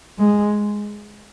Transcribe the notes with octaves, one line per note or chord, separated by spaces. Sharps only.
G#3